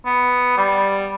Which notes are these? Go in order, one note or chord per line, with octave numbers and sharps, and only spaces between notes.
B3
G3